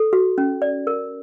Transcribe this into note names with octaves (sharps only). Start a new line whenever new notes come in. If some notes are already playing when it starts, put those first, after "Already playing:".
Already playing: A4
F#4
C#4
D5
A#4